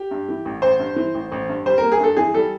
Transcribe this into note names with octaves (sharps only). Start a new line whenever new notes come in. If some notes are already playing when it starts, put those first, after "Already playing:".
Already playing: G4
G2
E3
A1
A1 C5
G2
E3
A1
A1
G2
G3 C5
A#4
A#3
G#4
G2 A4
E3 G#4
G3 A4